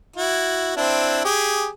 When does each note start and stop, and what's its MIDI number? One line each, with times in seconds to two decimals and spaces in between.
0.17 0.74 64
0.17 0.74 66
0.77 1.22 60
0.77 1.22 62
0.77 1.22 64
1.25 1.68 67
1.25 1.68 68